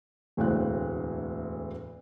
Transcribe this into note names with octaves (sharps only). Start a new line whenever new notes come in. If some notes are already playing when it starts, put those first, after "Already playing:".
E1 D2 A2 C4 F5 F#6